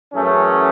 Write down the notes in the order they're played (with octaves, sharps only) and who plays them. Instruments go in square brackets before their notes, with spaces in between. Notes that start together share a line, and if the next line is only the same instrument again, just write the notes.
[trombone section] F#2 E3 A3 C#4 G#4